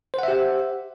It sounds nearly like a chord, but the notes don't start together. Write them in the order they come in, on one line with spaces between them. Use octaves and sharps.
C5 F#5 E5 G4